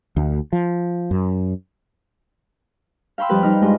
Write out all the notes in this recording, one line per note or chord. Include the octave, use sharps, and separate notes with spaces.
D2
F3
F#2
F5 G5 B5 C6 E6
F2 F3 G3 G4 B4
G3 D#4 F6
G2 G#3 F4